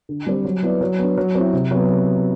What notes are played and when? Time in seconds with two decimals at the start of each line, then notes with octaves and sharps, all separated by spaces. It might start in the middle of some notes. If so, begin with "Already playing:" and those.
0.09 D3
0.27 G3 C4
0.45 F#3
0.62 B3 E4 B4 D5
0.81 F#3
0.98 B3 D4
1.17 F#3
1.35 C4 E4
1.53 C3
1.71 F#3 B3